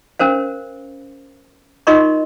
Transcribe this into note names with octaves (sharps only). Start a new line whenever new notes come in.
C#4 A#4 C5 F5
D#4 F4 A#4 D#5 C6 C#6